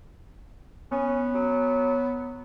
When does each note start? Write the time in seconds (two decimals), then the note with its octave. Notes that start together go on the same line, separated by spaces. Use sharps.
0.91 B3 C#4
1.35 F#3